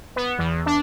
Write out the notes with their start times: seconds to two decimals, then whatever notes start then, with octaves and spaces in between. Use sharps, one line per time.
0.16 B3
0.38 E2
0.66 D4